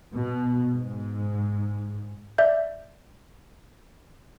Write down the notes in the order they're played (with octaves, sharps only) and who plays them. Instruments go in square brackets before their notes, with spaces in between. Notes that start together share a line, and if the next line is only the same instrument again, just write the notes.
[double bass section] B2
G#2
[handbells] D5 E5 G6